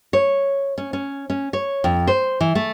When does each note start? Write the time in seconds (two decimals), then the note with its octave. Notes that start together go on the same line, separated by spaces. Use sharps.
0.13 C#5
0.78 C#4
0.93 C#4
1.30 C#4
1.53 C#5
1.84 F2
2.07 C5
2.41 E3
2.55 A3